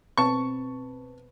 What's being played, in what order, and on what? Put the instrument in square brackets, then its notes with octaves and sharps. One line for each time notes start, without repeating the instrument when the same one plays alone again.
[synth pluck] B2 C4 B4 [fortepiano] A5 C#6